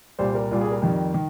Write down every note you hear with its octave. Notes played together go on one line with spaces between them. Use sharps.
C2 A#2 G3 C5
A#4
C2 A#2 G3 F4
G#4
A#4
F2 D#3 G3
D#3